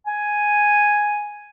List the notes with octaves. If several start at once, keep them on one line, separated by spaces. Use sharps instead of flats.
G#5